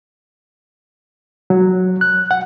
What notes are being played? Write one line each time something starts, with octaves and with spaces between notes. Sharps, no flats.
F#3
F#6
F#5